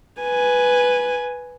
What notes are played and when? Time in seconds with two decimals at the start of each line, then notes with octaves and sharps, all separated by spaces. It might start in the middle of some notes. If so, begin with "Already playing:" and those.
0.22 B4 G#5